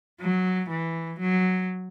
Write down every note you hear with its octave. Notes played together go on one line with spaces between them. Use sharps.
F#3
E3
F#3